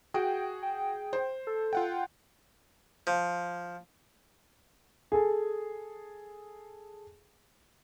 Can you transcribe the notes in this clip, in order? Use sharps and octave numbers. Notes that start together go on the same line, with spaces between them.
F#4 G#4 G5
G5
C5
A4
F4 F#5 G5
F3
G#4 A4